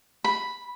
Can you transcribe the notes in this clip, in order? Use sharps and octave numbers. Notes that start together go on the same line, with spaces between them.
B5